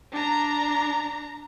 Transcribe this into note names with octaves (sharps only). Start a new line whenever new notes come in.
D4 A#5